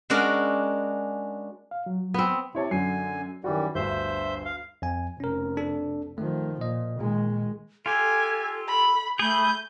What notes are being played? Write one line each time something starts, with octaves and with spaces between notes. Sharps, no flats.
G#3 C#4 D4 F#4 A#4
F5
F#3
B3 C4
C3 E4 C#5 A5
F#2 D3 F#4 G#5 C7
F#2 D#3 E3 G3 F#4
G1 D2 C5 E5 G6
F5
F2 G#5
F1 C#4 A#4
D4 A4
D#3 F3 A3
A#2 D#5
A#2 D#3 G#3
F4 G4 A4 G#5
B5
A3 G#4 B5 G6